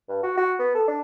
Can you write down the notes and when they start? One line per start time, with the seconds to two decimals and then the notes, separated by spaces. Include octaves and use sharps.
0.09 G2
0.23 F#4
0.37 F#4
0.59 B3
0.75 A4
0.88 D4